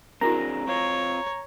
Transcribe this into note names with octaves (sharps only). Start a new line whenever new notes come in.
C4 D4 E4 F#4 G#4 A#4 A#5
C4 F4 C#5